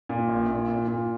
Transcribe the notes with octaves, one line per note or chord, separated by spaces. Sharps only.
A#2
A#1
A#2
A#2
A#2